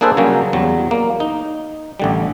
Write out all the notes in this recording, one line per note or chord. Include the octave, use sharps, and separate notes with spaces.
A#3 D4 G#4 A4 B4 C5
C#3 F#3 G3 A#3 C#4
E2 F#3 G3
A#3
D#4
A1 D3 G3